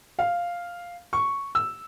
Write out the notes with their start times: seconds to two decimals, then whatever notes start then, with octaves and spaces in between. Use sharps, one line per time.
0.19 F5
1.13 C#6
1.55 E6